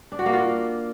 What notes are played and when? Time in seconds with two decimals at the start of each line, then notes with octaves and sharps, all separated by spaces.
0.12 D4
0.19 F#4
0.26 A#3
0.33 F4